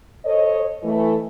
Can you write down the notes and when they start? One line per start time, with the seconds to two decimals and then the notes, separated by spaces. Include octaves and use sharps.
0.24 A4 C5 C#5 D#5
0.84 E3 A3